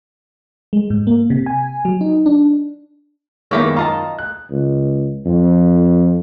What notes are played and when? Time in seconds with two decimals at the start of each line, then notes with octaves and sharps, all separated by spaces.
0.73 G#3
0.90 G#2
1.07 A#3
1.30 C3
1.46 G#5
1.85 F#3
2.01 D#4
2.26 D4
3.51 F#2 D#3 G#3 A#3 B3 E4 G4 C#5
3.76 F4 D#5 A5 A#5
4.19 F#6
4.51 C#2
5.26 F2